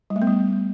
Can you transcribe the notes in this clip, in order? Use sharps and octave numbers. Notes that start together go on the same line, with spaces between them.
G3
A3
B3
G3